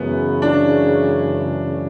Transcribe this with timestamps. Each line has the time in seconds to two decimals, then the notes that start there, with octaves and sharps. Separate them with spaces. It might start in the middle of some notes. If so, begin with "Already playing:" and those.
Already playing: F#2 C#3 E3 G#3 B3
0.42 D4